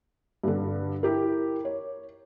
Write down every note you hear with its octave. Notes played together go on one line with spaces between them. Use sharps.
G2 D3
E4 G4 A#4
C#5